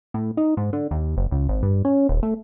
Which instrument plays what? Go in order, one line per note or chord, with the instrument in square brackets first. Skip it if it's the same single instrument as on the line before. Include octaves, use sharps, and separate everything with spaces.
[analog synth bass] A2
D#4
G#2
D3
D#2
F#1
C#2
G#1
G2
C#4
D#1
A3